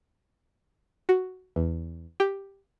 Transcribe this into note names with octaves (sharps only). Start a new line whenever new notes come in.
F#4
E2
G4